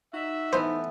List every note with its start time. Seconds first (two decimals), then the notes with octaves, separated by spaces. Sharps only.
0.13 D#4 F#4 E5
0.53 E3 A3 B3 C5